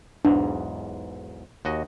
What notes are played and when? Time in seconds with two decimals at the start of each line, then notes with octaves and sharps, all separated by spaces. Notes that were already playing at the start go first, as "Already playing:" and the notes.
0.25 B1 E2 G#2 D4
1.65 D#2 F#4 D#5